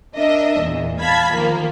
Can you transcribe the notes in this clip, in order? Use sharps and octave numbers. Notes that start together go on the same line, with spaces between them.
D4 A#4 D#5 E5
E2 A#2
F5 A5 B5 G#6 B6
D#3 F3 A#3 A#4